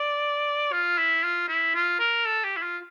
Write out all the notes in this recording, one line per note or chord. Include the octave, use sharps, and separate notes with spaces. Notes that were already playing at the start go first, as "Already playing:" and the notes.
Already playing: D5
F4
E4
F4
E4
F4
A#4
A4
G4
E4
F4